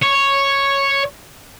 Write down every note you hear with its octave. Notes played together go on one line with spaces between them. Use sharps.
C#5